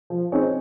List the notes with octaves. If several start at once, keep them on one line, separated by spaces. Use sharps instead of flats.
F3
C4 D#4 G#4 C#5